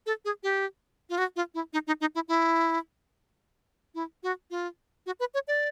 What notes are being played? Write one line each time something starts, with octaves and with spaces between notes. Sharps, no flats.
A4
G#4
G4
F4
F#4
F4
E4
D#4
D#4
D#4
E4
E4
E4
F#4
F4
F#4
B4
C#5
D5